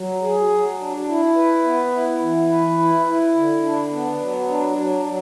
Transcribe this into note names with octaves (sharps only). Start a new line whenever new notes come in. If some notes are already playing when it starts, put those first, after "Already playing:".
Already playing: F#3
G#4
F#3
D4
E4
B4
B3
E4
E3
B4
E4
E4
D3
D4
B3
F#3
D4
F#3
F#3